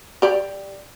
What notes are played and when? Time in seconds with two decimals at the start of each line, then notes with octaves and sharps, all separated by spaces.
0.22 G4 D5